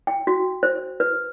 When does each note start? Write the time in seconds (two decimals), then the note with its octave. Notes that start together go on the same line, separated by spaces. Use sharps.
0.07 G5
0.27 F#4
0.63 C5
1.00 B4